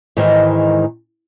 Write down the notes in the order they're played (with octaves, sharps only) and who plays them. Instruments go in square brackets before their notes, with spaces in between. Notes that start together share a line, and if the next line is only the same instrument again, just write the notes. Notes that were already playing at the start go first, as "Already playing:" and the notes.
[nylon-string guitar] G#2 D#3 E3 G#3